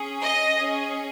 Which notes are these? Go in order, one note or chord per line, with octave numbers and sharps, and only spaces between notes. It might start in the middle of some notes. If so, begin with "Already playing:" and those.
Already playing: C#4 G#4
D#5
C#4 G#4